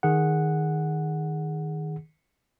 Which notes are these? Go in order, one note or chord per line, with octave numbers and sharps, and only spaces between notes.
D#3 G#4 F#5